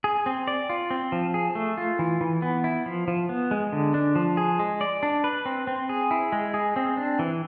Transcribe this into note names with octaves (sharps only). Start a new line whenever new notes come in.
G#4
C4
D5
F4
C4
F3
G#4
A3
F4
E3
E3
B3
E4
F3
F3
B3
G#3
D3
D4
F3
G#4
G#3
D5
D4
B4
C4
C4
G#4
E4
G#3
G#4
C4
D4
E3